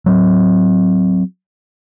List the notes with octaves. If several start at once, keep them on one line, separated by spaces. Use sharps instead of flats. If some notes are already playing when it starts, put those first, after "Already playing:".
F#3 C4